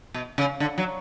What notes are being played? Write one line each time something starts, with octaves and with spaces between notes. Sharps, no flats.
B2
C#3
D3
F#3